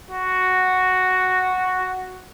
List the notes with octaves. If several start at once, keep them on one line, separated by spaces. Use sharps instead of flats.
F#4